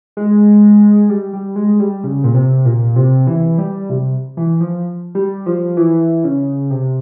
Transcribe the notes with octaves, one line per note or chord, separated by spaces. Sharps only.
G#3
G3
G3
G#3
G3
C#3
A#2
C3
A#2
C3
E3
G3
C3
E3
F3
G3
F3
E3
C#3
C3